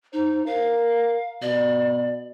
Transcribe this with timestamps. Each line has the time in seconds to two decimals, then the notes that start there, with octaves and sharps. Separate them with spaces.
0.13 D#4 C5
0.46 A#4 F5
1.42 B2 D5